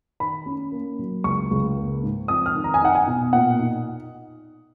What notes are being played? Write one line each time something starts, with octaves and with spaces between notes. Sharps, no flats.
D#3 B5
C#4
A#3
F#3
C#2 C#6
C#2
A#3
G#2
F2 D#6
F6
D#3
A#5
G#5
D#4 F#5
G#5
B2
A#2 F#5
D#4